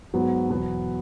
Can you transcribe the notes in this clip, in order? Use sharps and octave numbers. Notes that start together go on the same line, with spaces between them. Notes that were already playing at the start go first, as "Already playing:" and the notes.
G#2 F#3 B3 F#4
E2 B2 F#3 B3